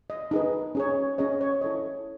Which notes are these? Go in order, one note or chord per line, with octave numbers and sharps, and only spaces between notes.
D#5
D#4 G#4 B4
C#4 G#4 C#5
C#4 G#4 C#5 D#5
C#5
E4 A4 C#5 D#5